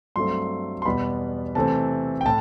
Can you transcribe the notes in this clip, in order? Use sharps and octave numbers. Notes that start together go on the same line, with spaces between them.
G2 F#3 A3 C4 C6
C6
E2 B2 G3 B3 B5
C3 E3 A3 C4 A5
G5
A2 A5